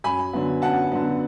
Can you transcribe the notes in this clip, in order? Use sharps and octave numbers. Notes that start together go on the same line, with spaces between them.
F#2 G#5 B5
D3 F#3 B3
F#2 F#5 A5
D3 F#3 B3